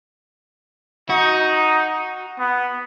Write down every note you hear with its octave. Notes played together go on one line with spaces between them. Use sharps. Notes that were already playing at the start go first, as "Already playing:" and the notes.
D#4 F#4
B3